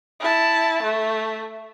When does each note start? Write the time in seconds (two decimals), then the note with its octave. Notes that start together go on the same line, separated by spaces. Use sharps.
0.20 E4 A5
0.83 A3